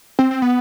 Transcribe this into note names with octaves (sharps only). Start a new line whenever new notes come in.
C4
C4
B3